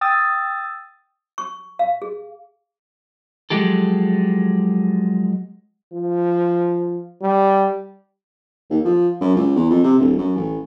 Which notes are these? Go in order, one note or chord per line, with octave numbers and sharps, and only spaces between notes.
G5 D#6 E6 A6
C#6
F5
G#4
F3 F#3 G#3 G4 A4
F3
G3
D#2
F3
F#2
C#2
E2
F2
C3
D1
F#2
A1